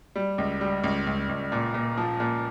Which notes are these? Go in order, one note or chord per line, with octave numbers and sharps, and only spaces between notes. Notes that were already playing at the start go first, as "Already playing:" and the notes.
G3
C#2
G3
C#2
C#2
C#2
A#2
A#2
F3
A#2